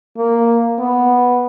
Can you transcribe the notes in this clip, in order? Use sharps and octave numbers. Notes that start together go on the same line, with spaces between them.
A#3
B3